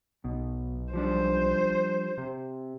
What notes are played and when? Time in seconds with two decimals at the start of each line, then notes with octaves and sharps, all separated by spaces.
0.24 B1 B2
0.93 F3 G3 D4 C5
2.18 C3